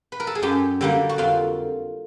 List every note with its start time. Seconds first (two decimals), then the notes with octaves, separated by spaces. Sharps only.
0.12 B4
0.20 A#4
0.27 A4
0.35 G#4
0.42 F#2 G4
0.81 D3 G3 A#3
1.09 F#4
1.18 F2 F4